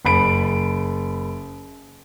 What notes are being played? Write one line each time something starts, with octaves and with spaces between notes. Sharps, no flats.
F#1 B5 D7